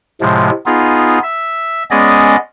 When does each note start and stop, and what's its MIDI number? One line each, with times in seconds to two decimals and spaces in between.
0.21 0.50 45
0.21 0.50 48
0.21 0.50 53
0.21 0.50 56
0.66 1.19 59
0.66 1.19 63
0.66 1.19 65
0.66 1.19 68
1.23 1.83 76
1.91 2.36 56
1.91 2.36 59
1.91 2.36 61
1.91 2.36 68
1.91 2.36 74
1.91 2.36 75